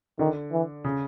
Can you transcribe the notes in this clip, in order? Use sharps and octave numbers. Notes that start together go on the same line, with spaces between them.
D3 D#3
E3
C#3